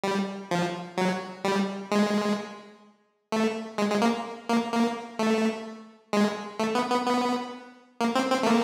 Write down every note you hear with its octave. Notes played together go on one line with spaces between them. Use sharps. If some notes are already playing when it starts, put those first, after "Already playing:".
G3
F3
F#3
G3
G#3
A3
G#3
G#3
A#3
A#3
A#3
A3
G#3
A3
B3
B3
B3
A#3
C4
C4
A3
A#3